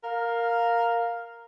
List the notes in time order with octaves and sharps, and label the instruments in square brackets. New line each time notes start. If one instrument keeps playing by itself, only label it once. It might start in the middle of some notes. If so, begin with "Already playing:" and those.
[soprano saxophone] A#4 [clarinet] F5